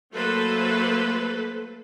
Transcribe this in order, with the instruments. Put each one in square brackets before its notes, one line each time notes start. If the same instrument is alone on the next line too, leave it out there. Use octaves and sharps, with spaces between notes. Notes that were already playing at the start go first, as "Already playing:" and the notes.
[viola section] F#3 A3 A#3 A4 B4 C5